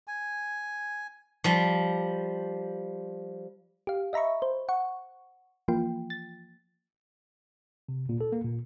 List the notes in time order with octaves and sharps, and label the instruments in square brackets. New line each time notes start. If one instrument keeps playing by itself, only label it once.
[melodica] G#5
[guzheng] F3 G3
[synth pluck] G4 F5
D#5 E5 A#5 B5 C#6
C5
F#5 C#6
E3 F3 A#3 F4 G5
A6
[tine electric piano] C3
A#2
A4
A#3
A#2